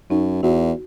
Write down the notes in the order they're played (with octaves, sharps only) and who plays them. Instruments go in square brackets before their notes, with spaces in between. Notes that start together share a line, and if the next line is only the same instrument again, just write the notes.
[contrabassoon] F#2 [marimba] D#4
[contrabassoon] E2 [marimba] F#4